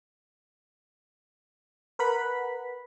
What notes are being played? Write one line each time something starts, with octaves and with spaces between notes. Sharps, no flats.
A#4 B4 F#5 B5